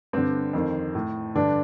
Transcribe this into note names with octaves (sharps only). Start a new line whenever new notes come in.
G2 D3 C4
F2 D#3
A2
G2 D3 D4